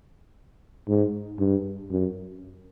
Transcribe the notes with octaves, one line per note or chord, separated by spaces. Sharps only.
G#2
G2
F#2